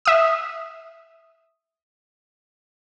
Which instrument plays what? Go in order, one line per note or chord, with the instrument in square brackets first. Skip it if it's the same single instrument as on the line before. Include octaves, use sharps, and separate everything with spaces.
[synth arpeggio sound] E5 D#6